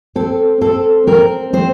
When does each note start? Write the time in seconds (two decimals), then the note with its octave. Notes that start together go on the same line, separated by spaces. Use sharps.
0.15 C4 A4
0.61 C4 A4
1.07 C4 A#4
1.53 C4 C5